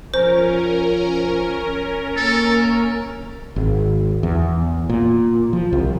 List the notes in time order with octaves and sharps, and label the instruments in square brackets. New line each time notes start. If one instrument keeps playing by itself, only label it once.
[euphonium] F3 [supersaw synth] C#4 A#4 [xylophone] C5
[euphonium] A#3 [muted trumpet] A4
[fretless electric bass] G#1
E2
A#2
F3
C2